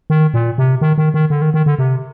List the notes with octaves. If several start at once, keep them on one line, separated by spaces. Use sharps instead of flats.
D#3
A#2
C3
D#3
D#3
D#3
D3
D#3
D#3
D3
C3